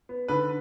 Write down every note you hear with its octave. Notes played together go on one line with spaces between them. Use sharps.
B3
D3 B4